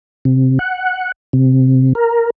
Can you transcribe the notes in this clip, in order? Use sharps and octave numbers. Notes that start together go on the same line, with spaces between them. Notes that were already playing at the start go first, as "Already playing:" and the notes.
C3
F#5
C3
A#4